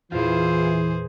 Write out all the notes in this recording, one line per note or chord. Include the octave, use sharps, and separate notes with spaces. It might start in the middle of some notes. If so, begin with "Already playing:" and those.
E2 A#2 E3 E4 F4 G#4 C5